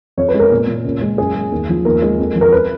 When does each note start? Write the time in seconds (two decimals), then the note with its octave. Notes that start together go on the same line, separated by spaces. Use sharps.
0.17 F2 C#5
0.29 B4
0.34 G#3
0.39 A#4
0.51 A#2
0.68 A#2
0.84 C#2
1.01 G#3
1.18 F#2 G#4
1.35 G#3
1.52 D#2
1.69 F3
1.85 D#2 A#4
2.02 G#3
2.19 F2
2.35 F3
2.41 A#4
2.52 B4